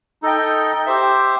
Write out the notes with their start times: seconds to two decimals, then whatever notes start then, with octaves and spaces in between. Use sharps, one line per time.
0.23 D#4 A4 D#5 G5
0.86 G4 C5 E5